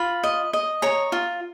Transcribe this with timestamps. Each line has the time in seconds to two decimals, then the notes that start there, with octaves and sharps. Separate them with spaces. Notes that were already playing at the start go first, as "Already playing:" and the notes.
Already playing: F4 B5
0.24 D#5
0.53 D#5
0.82 C#5 A#5
1.12 F4